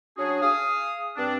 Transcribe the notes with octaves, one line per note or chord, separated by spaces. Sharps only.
F#3 C#4 D4 F#4 G#4
G#4 F5 D#6
G2 C4 D4